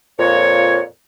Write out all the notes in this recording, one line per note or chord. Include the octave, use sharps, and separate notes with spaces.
F2 A#2 C#5